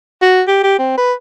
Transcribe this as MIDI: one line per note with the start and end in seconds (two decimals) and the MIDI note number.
0.22 0.42 66
0.47 0.59 67
0.63 0.78 67
0.79 0.97 60
0.97 1.13 71